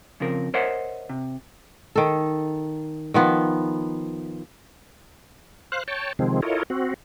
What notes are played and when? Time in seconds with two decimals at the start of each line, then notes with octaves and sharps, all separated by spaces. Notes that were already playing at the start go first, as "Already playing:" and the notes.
0.20 F2 C#3 F3 C4 A#4
0.54 A#4 C5 C#5 D#5 E5 F#5
1.09 C3
1.96 D#3 A4
3.14 D#3 F3 B3
5.72 C5 F5 F#6
5.88 C#5 G5 A5
6.19 C3 D#3 F3 G#3 C4
6.42 E4 F4 A4 A#4 C#5 D#5
6.70 C4 F#4